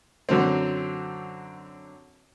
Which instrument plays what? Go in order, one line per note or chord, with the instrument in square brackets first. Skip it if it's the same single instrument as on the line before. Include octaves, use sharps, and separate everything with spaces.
[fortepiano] F#2 D3 F#3 C4